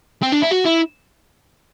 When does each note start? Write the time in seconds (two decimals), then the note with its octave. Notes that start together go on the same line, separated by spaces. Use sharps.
0.23 C4
0.32 D4
0.42 E4
0.51 F#4
0.65 E4